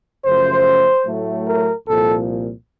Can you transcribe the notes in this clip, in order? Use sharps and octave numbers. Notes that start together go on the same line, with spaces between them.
F#2 C#3 F3 A3 C5
A2 F#3 A3
A#4
C2 A#2 F3 A4